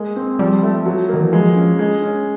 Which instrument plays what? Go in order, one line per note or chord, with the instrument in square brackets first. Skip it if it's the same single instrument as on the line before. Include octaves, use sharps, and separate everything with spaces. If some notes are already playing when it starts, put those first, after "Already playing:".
Already playing: [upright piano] G#3 A#3
C4
[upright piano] F3 [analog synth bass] G3
[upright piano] A3
F#3
[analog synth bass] D#3 [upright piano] A#3
[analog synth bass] E3
[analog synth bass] F3 [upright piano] G#3
[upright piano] C#4
G#3
C#4